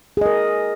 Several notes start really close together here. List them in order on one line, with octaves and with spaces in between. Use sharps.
G#4 D#5 A#4